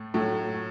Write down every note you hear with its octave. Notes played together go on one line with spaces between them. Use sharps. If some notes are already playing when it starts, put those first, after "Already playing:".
Already playing: A2 A3
A2 F#3 A3